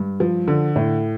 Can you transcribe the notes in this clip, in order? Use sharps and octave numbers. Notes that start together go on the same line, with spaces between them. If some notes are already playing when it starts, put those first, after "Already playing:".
Already playing: G2
F3
D3
A2